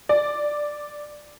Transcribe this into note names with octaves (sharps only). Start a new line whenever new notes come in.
D5